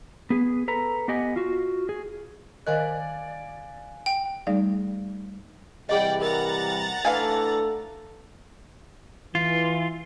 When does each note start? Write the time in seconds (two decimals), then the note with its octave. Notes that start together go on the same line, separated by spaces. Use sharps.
0.30 B3 G#4
0.68 A4 B4 A#5
1.08 B3 G4 D#5 F#5 G#5
1.36 F4 F#4
1.89 G#4
2.67 D#3 A#4 D5 D#5 F5 G#5 F#6
4.06 G5
4.47 G3 A3 D#4 G#4 D5 F5
5.89 C3 E3 G3 G#4 D5 D#5 F#5 G5
6.22 A#4 F#5 A#5 A6
7.05 E3 A3 D4 A4 F5 G#5
9.35 E3 F4